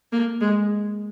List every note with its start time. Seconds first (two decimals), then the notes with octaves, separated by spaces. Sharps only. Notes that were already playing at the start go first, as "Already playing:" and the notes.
0.12 A#3
0.41 G#3